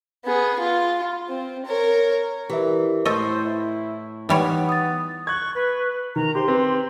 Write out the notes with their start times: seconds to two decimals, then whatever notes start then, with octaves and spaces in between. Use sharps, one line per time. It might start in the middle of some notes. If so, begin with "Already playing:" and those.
0.25 B3 G#4
0.59 F4
1.29 C4
1.66 A#4 C#5
2.50 E3 G3 G4 A#4 E5
3.05 A2 A4 C5 D#5 C#6
3.47 E4
4.29 E3 G3 B3 D#4 C#5
4.69 D#6 A6
5.27 C#6 F#6 G#6
5.55 B4
6.16 D#3 A#5
6.35 G4 C5 C6
6.48 C4 B4